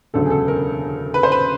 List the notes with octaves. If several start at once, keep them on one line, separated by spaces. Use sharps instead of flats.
E1 D2 C#3 F#3 A4
G#4
A4
A#4
B4
C5
B4